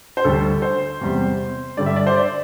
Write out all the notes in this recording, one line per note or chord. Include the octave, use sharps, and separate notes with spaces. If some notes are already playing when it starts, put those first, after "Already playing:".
C5
D2 D3 G3 A4
C5
E2 C3 G3
G2 D3 G3 D5
E5
D5
C5
D5